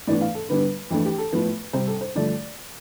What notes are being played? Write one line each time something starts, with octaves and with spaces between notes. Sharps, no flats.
A2 E3 B3 D4 D5
F5
A4
D3 G3 B3 D4 B4
F2 E3 A3 D4
G4
A4
A2 F3 B3 B4
C3 G3 C4 C5
A4
C5
G2 D3 F3 A3 D5